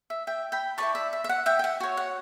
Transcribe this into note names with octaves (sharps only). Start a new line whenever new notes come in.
E5
E5 G5
G5 B5
B4 D5 A5 C#6
E4
E5
E5
E5
F#5
E5 G5
G5
F#5
F#4 C#5
F#5